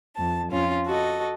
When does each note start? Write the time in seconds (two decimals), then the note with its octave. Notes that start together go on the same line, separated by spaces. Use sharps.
0.16 F2 A5
0.51 F2 C#4 F4
0.86 F#4 A4 D#5